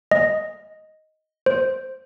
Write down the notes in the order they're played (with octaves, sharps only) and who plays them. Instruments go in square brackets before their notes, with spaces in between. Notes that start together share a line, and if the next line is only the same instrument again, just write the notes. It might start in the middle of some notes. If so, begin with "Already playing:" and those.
[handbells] D#5
C5